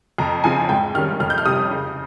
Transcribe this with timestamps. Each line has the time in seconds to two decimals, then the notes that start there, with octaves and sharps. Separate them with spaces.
0.18 F2 A#5
0.44 C#3 F3 C4 G#5
0.69 G#2 G5
0.94 D#3 G3 C#4 F6
1.20 F2 F6
1.30 G6
1.38 F6
1.45 C3 G3 D#6
1.71 C#3